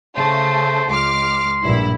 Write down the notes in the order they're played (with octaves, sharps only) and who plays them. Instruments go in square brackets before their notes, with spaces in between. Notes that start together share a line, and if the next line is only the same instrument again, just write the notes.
[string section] C#3 A3 [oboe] C5
[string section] C#2 D6 F6 [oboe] C6
[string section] A#1 G2 E4